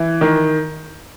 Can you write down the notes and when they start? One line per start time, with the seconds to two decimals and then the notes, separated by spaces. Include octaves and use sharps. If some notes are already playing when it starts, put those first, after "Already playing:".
Already playing: E3
0.21 D#3